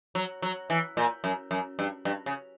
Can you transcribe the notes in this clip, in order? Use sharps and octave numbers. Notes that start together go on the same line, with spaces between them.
F#3
F#3
E3
A#2
F#2
F#2
G2
G2
C#3